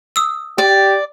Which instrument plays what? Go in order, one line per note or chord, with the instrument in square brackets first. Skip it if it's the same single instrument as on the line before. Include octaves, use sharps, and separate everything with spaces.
[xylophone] D#6 E6
[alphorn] G4 [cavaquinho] D5